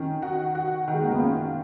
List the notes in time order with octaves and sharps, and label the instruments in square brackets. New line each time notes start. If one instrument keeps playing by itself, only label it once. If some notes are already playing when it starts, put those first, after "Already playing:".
Already playing: [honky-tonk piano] D#3 [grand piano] C#4
[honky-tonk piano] F#4
F#4
D#3
[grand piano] G#3
A#3
B3
[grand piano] C#4 [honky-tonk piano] F4